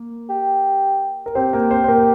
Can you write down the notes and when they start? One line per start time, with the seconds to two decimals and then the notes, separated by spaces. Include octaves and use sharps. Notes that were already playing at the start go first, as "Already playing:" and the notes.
Already playing: A#3 A#4
0.29 G4
1.26 A#4
1.35 C4 G4 C5
1.53 A#3 A#4
1.71 C4 C5
1.84 C5
1.88 A#3 A#4